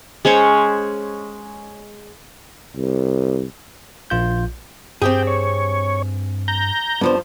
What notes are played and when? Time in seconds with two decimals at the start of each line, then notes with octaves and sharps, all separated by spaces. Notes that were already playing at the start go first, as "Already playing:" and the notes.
0.25 G#3 C#4 C5 C#5
2.77 C2
4.10 A#1 F4 G6
5.02 G2 C4 G4 G#4 G5
5.27 C#5
6.48 A#5 G6
7.01 G2 F3 B3 D4 C5